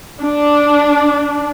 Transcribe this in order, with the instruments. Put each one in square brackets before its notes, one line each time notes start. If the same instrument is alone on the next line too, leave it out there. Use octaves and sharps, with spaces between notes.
[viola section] D4